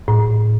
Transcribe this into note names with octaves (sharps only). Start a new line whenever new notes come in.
A2